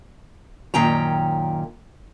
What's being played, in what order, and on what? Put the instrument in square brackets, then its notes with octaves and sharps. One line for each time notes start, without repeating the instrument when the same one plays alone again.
[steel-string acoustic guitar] F#2 A#2 D#3 C#4 G5 A#5